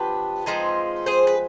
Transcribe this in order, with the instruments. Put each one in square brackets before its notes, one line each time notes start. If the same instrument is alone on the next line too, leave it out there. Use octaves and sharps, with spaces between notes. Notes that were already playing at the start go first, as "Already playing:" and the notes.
Already playing: [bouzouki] F3 B3 D4 G4 B4
F3 G#3 C4 D#4
G#4 C5
B4